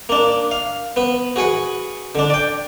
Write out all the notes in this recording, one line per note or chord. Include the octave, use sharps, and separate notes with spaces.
A#3 D4
F5
B3 B4
F#4 G#4 B4 F#5
D3 D4
D5 G5